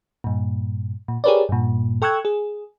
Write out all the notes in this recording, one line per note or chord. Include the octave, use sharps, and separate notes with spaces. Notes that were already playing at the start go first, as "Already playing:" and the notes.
G2 A#2
A#2
G4 G#4 A#4 B4 C#5 D5
G2 A#2
A4 G5 C#6 E6 F#6 G#6
G#4